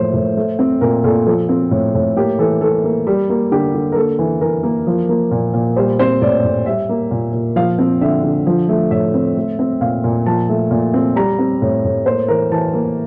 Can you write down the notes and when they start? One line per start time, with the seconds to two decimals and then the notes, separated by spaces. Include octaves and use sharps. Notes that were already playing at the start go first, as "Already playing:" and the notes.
Already playing: A2 E3 F3 A#3 C5
0.13 A2
0.37 A3
0.59 C4
0.81 A#2 A#4
1.04 A#2 A4
1.26 F3 A4
1.49 C4
1.71 A2
1.94 A2
2.16 A#3 G4
2.38 E3 A4
2.61 E3 A4
2.84 A#3
3.07 G3
3.30 A#3
3.52 D3 G4
3.75 D3
3.92 A#4
3.96 A#3 A4
4.19 E3
4.41 E3 A#4
4.63 A#3
4.87 F3
5.09 A#3
5.31 A#2
5.54 A#2
5.76 G3 C5
5.99 C4 C5
6.21 A2 D5
6.44 A2
6.66 G3 E5
6.89 A#3
7.11 A#2
7.33 A#2
7.56 F3 F5
7.79 C4
8.01 D3 E5
8.24 D3
8.47 F3
8.69 A3
8.91 A2 E5
9.14 C4
9.37 A3
9.59 C4
9.81 A#2 F5
10.04 A#2
10.26 F3 A5
10.49 A3
10.71 A#2
10.94 C4
11.16 G3 A#5
11.39 C4
11.62 A2
11.84 A2
12.06 A#3 C5
12.28 E3 A#4
12.51 E3 A5
12.74 A#3